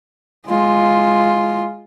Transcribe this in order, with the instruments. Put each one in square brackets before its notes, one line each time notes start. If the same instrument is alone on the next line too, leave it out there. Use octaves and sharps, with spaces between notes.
[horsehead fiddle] G#3 F4